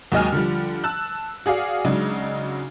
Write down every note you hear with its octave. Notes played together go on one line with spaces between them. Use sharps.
D#2 F#3 G#3 D#5 G#5 F6
D3 F3 G3
A5 E6 F#6
F#4 G#4 D5 F5
C#3 F#3 G#3 D4 D#4